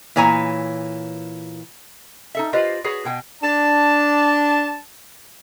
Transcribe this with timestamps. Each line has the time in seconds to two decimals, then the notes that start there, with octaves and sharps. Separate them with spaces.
0.16 A#2 E3 C#5 G#5 A#5
2.35 D#4 A4 E5
2.53 F4 G4 B4 C5 D5 D#5
2.84 F#4 G#4 B4 C#5
3.05 B2 G5 G#5
3.42 D4 A5